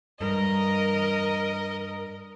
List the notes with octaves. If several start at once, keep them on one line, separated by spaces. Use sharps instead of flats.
G2 A#4 D#5